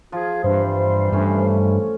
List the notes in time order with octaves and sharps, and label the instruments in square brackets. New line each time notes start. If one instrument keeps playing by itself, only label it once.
[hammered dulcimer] F3 [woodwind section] F4 G#4
[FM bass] G2 [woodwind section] C3 E3 G3 [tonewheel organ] C5
[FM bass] G2 [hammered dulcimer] A3 C#4